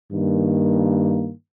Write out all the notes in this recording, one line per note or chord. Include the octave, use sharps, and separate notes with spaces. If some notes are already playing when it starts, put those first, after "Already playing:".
G2 D#3 A#3